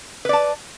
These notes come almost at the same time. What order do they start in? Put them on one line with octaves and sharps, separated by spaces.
B4 D5 A5